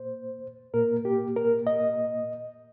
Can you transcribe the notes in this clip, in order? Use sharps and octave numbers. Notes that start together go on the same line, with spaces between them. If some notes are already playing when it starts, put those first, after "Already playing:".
Already playing: A#2 A#3 C5
A#2 A#3 A#4
G4
A#4
D#5